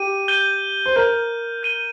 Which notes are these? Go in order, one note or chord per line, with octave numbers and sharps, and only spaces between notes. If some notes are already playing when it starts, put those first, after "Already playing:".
Already playing: G4 D#7
G6 D#7 G7
C5
A#4 G6 D#7 G7
G6 D#7 G7